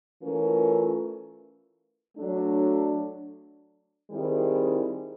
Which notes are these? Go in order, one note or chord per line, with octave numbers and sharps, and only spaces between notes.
E3 A3 C#4 F4 A#4
F#3 A3 D4
D#3 G3 C4 E4 G#4